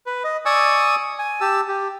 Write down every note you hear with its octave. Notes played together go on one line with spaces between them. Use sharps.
B4
D#5
D5 G#5 C#6 D#6 E6
G#5
G4 A5 E6
G4